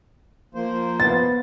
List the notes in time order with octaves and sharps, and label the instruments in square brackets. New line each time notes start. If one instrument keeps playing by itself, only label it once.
[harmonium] F3 A#3 C5
[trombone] B3 [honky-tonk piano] A6